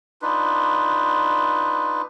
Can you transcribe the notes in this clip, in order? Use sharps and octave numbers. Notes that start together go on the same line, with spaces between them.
D4 D#4 F4 B4